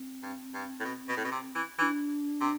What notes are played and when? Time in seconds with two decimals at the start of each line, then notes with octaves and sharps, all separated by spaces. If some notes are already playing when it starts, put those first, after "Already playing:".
Already playing: C4
0.23 G2
0.54 G2
0.80 A2
0.85 B2
1.09 B2
1.17 A2
1.24 B2
1.31 C3
1.55 E3
1.78 E3 D4 E4
2.41 C3